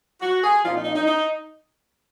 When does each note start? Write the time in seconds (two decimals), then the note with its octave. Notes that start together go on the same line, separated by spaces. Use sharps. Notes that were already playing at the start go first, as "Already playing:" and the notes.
0.21 F#4
0.43 G#4
0.63 A#2 F3 C4 D#4 F4
0.74 D#4
0.84 D#4
0.95 D#4
1.06 D#4